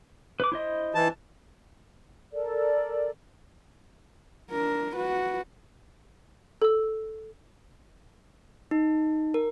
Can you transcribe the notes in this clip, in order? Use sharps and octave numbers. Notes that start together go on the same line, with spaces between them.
B4 D6
E4 C5 D#5
E3 A5
A4 A#4 D5
D4 A#4
F#4 B4
A4 E6
D#4
A#4